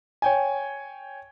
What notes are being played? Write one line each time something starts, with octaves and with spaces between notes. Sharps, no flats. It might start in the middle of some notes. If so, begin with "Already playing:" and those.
C#5 G5 G#5